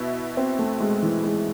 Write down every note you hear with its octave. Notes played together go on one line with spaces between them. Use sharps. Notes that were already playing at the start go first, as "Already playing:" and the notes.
Already playing: B2 E4
C4
A3
G#3
E3
G#3